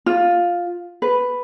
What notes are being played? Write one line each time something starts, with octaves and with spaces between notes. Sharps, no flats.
F4
B4